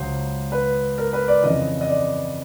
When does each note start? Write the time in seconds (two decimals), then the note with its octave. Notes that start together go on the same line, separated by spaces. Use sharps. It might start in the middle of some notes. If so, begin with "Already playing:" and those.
Already playing: C#2 C#3 F#3 C5
0.52 B4
0.98 A#4
1.13 B4
1.28 D5
1.43 F2 C#3 E3 D#5
1.81 D#5
1.89 D5